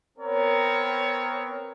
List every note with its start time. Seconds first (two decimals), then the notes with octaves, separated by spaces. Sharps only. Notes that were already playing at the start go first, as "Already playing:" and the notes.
0.18 B3 C4 A#4 C#5